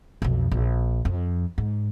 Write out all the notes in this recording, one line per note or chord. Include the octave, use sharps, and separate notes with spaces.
B1 F2
A#1
F2
G#2